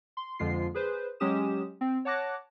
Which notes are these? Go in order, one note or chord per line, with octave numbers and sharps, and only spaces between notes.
C6
F2 D3 F3 G#3 F4 C7
G#4 B4 C5
F#3 G#3 C#4 G4 D#6 E7
C4
C#5 F#5 A5 D6 F#6 A#6